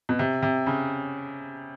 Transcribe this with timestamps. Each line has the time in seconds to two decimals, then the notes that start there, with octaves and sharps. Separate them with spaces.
0.09 B2
0.19 C3
0.43 C3
0.67 C#3